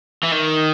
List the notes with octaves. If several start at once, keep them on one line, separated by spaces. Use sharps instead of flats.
E3
D#3